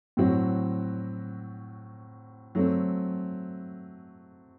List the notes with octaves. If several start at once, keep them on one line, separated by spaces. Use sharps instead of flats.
A2 F#3 C4 F#4
F#3 A3 C4